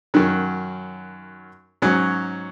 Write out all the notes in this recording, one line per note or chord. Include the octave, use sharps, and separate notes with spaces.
F#2 D#3 F#3
G#2 F#3 C#4